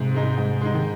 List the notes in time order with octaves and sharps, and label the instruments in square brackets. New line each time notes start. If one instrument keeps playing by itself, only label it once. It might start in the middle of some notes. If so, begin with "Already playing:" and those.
Already playing: [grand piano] G#2 [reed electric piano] C3
[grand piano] G#3 D#4
G#2
G#3 D#4
[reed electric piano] D#3